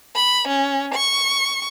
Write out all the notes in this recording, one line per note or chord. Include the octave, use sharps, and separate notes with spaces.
B5
C#4
C#6